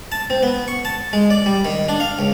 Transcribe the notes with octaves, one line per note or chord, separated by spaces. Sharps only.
A5
C4
B3
C#6
A5
G#3
D5
G3
D#3
D4
F5
C#2